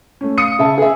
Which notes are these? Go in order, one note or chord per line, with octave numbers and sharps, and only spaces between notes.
A3 C#4
F5 D#6 C#7 D#7
C#3 E5 A5
G#4 E5